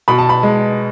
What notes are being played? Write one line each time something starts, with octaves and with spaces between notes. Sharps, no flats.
B2 B5
A5
B5
G#3